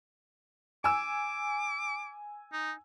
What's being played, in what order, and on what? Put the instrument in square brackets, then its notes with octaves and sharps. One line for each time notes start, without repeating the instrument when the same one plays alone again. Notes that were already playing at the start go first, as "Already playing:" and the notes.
[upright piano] G#5 E6 [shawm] D6
[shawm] D#4